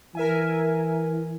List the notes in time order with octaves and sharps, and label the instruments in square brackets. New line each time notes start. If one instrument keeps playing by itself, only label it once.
[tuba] E3 [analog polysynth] A#4 E5 G#5